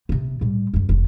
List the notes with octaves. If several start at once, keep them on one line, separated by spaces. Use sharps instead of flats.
C3 B3
A2 G3
F#2 C#3
F1 D#2